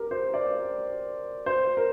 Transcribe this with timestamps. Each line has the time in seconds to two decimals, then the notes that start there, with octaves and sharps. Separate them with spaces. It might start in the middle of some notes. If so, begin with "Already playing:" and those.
Already playing: G4 A#4
0.11 C5
0.34 D5
1.46 C5
1.77 A#4